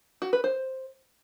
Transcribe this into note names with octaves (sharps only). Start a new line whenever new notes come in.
F#4
B4
C5